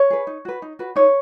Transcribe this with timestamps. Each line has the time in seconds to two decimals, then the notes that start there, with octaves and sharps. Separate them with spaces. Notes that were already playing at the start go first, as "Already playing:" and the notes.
Already playing: C#5
0.10 G#4 B4
0.27 D#4
0.45 F#4 B4
0.62 D#4
0.79 F#4 B4
0.96 D#4 C#5